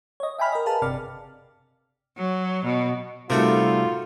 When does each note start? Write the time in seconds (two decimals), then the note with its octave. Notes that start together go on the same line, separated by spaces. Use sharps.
0.20 C#5 D#5
0.38 E5 G5 G#5 B5 F6
0.52 A#4 D#5
0.66 G#4 A#4 B4 F5 A5
0.82 G1 C3 D5 F6
2.17 F#3
2.64 B2
3.30 C3 G3 A3 D#4 F4 F#4 A4 A#4